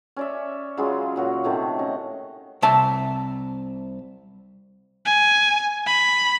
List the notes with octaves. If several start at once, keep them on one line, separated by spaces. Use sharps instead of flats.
C#4 D5 E5
C#3 F#3 G#3 F4
A#2 F#3 F#4
A2 C3 D#3 A3
C#4 D#5
C2 E5 A5
G#5
B5